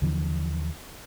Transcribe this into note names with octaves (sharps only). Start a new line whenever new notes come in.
D#2 D3 E3 F3